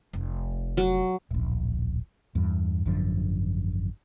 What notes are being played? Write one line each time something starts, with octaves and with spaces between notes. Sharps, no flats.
F1
F#3
D1 A#1
E2 G2
G#1 F#2 D3 F3